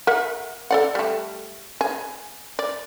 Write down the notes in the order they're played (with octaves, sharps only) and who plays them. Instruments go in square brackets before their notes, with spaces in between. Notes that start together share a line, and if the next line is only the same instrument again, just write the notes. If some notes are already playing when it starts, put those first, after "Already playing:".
[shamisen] A#4 E5 F#5
A4 D5 F#5
G3 A3
G#4
D5